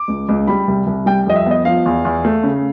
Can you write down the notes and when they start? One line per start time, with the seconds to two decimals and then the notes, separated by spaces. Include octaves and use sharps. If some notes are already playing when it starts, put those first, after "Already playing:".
Already playing: D6
0.08 C#2
0.29 C#2
0.47 G3 B5
0.68 C2
0.86 C2
1.06 G3 G5
1.26 F2 D#5
1.36 E5
1.46 B3 D#5
1.65 F3 F5
1.86 E2
2.05 E2
2.25 A3
2.44 C#3